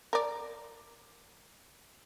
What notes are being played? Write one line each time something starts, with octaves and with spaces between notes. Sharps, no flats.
A#4 D5